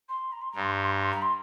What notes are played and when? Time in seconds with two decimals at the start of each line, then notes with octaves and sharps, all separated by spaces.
0.08 C6
0.32 A#5
0.41 C6
0.51 G2 A#5
0.62 C6
0.72 A#5
0.81 C6
0.91 A#5
1.01 C6
1.11 A#5
1.22 C6